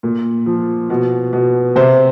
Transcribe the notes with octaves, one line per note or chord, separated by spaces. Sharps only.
A#2
F3
B2
B2
C3 C5